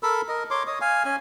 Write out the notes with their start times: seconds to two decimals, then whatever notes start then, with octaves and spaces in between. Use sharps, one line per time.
0.03 A4 A#4 B5 E6
0.29 A#4 D#5
0.50 C#5 C6 D6
0.67 C#5 D#5 D#6
0.81 F5 G#5
1.05 C#4 G#5